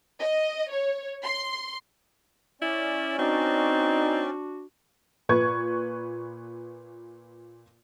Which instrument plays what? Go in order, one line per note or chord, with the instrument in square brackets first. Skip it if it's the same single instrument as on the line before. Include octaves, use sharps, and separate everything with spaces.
[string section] D#5
C#5
C6
[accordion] C#4 D5 [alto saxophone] E4
[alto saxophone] C4 [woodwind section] D4 F#4 [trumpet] D#4
[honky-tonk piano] A#2 B4 C#6 G#6